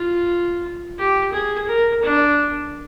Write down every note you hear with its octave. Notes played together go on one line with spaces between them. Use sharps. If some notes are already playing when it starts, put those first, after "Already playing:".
Already playing: F4
G4
G#4
A#4
D4